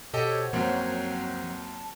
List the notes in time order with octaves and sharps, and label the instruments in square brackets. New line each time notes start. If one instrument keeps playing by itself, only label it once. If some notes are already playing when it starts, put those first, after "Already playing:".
[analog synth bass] B2 [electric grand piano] G4 A4 D#5 [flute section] C5 C#5 F#5
[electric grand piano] F#2 A#3 [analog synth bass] F3 [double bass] F#3 C4
[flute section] A5